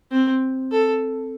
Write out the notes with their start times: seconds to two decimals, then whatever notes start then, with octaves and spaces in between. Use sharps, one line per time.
0.11 C4
0.72 A4